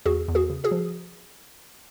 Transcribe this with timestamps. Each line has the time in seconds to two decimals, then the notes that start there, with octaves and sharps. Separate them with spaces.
0.06 E2 F#4 G#4
0.28 E2
0.35 F#4 G#4
0.50 C#3
0.64 F#4 G#4
0.71 F3